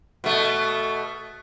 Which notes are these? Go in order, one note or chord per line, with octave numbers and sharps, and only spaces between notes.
B2 A3